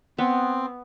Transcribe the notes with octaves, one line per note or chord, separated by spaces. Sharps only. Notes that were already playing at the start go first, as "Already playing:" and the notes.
B3 C4